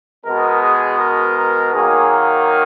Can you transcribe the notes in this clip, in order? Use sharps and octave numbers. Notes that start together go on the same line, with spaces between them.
B2 G#3 B3 A#4
G#4
A#4
A#4
D#3 F#3 A#3 G#4